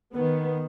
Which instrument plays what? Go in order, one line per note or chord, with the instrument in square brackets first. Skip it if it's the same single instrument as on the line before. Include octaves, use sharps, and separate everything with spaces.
[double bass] D#3 [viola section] B3